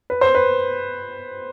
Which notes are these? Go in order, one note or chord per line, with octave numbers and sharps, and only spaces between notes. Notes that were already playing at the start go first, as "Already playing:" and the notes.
B4
C5
B4